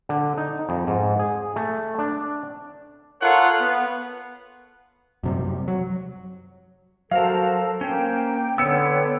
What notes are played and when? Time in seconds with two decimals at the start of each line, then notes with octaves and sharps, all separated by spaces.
0.09 D3
0.37 D#4
0.69 F2
0.87 G#2
1.19 G#4
1.56 A3
1.99 D4
3.21 F4 A4 A#4 C#5 F#5
3.60 B3
5.23 F#2 C3 G3
5.68 F#3
7.11 F#3 F#4 A4 A#4 C5 F5 A5
7.81 A#3 C#4 C5 G5
8.58 D3 B3 B4 C#5 G5 E6 C#7